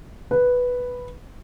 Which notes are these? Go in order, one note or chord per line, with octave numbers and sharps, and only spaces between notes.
B4